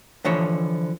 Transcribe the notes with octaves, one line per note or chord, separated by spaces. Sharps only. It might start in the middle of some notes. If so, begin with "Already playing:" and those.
D3 E3 F3 C5 C#5